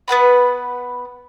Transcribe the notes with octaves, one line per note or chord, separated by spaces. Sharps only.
B3 B4 F#5 B5